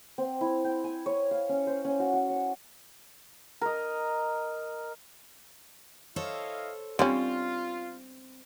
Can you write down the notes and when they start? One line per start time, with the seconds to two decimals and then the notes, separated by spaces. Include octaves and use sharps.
0.18 C4
0.41 E4
0.64 G5
0.84 G#5
1.06 C#5
1.31 F5
1.49 C#4
1.67 C5
1.85 C#4
1.99 F#4
2.13 F#4
2.30 C#5
3.61 A#4 D#5
6.16 E4 A4 C5 C#5 D#5 F5
6.99 D3 G3 C4 C#4 F4